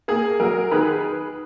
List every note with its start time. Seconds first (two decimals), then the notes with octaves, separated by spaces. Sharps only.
0.08 A#3 G#4
0.40 F#3 A#4
0.71 D#3 G#4 B4